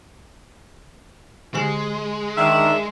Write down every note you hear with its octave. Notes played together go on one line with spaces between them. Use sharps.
D3 G#3 G4 G#5
D#3 D4 E5